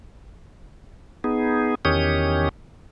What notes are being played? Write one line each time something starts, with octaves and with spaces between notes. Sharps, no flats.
B3 D#4 G#4
E2 D#3 C#4 G4 C#5 D#6